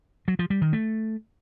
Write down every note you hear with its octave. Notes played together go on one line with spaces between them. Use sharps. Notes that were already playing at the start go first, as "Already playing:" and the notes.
F#3
F3
G3
D#3
A3